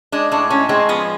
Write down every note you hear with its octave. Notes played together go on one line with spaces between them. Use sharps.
G#3 D4
A2 D4
G#3 C#4
G#3 C4
F3 B3